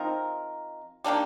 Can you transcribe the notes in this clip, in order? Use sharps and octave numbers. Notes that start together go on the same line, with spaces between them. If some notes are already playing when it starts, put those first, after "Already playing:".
Already playing: F3 C4 D#4 A#4
D#3 A#3 D4 G4